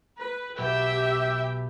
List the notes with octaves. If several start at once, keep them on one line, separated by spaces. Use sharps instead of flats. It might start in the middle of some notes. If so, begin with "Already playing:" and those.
B4
B1 B2 B3 G4 E5 G5